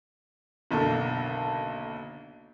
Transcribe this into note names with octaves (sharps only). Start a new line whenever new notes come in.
F#1 B1 D3 A4